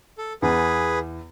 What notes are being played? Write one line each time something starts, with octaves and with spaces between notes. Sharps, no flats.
A4
E2 G#4 B4